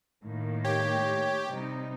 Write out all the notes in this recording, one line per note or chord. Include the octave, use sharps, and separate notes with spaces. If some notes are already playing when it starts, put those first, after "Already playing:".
A2 D#3 A#3
G4 C#5
C3 G3 D#4